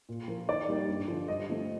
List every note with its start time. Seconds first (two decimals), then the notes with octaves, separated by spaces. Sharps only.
0.09 A#2
0.28 F3 A#3
0.48 D#3 D5
0.69 G3 A#3 D#4
0.89 G2
1.08 D3 F3
1.28 G2 D#5
1.49 D3 F3 A3 C4